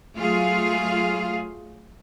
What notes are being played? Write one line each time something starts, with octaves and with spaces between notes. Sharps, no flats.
F#3 A3 F4 G#4 F5